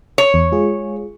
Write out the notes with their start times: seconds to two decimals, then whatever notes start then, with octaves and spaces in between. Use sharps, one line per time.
0.18 C#5
0.34 E2
0.52 G#3 F4 G#4